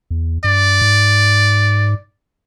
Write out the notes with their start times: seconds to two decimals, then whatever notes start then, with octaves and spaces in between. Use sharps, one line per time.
0.11 E2
0.44 G2 D5
0.82 G#2